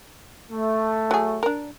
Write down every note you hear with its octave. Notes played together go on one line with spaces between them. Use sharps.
A3
F#3 G#4
D4 A#4